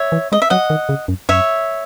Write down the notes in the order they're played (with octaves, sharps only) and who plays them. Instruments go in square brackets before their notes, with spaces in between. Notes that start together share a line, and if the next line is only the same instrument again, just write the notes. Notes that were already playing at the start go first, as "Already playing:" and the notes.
Already playing: [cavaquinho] C#5 E5
[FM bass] E3
[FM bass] G#3 [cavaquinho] D#5
[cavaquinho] E5
[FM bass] F#3 [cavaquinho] D#5 F#5
[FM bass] D#3
C#3
F#2
[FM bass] F#2 [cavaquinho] C#5 E5